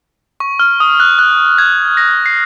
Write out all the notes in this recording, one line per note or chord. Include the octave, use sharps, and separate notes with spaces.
C#6
F6
D#6
F#6
F#6
G#6
A#6
C7